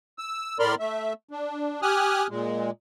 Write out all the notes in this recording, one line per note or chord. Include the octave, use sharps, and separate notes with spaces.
E6
A2 A#4 D5 B5 C6 F6
A3 E5
D4
G4 G#5 D#6 F6 F#6
A#2 G#3